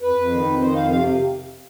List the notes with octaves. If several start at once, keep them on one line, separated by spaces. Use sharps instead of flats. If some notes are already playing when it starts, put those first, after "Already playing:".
F2 B4
F2
D#3
F2
D#3 C5
F2 F5
C3 F5